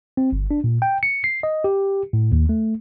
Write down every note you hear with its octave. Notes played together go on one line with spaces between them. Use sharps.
C4
G1
D4
A#2
G5
C#7
C7
D#5
G4
A2
D#2
A3